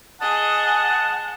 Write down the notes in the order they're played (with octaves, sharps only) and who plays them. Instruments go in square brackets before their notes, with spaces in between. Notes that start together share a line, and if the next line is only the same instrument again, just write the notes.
[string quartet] G#4 D#5 [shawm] F#5 [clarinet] A5 [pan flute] D#6